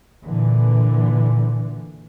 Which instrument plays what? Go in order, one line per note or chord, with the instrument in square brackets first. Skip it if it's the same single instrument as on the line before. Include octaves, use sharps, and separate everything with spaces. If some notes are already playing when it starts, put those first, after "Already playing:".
[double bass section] A#2 D3 E3